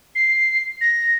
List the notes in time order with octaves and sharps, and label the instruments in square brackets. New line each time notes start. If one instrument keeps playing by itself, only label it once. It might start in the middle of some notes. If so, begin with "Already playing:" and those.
[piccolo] C7
A#6